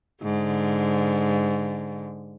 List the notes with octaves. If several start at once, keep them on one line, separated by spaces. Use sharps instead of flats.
G#2 D3